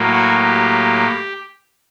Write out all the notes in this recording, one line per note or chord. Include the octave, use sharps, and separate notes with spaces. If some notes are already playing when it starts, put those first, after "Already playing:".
Already playing: A2 F#3 A#3
F#4
G4